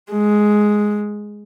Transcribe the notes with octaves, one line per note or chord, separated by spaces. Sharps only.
G#3